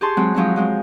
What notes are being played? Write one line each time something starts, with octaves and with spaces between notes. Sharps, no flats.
G4 G#4 A5 C6 C#6
F#3 G#3 C4
F3 F#3 G#3 C4 D#4
F3 G#3 C4